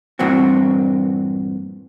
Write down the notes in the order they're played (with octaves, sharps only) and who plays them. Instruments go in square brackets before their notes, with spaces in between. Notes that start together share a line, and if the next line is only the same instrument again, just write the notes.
[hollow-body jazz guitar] G2 A#2 E3 C4 F#4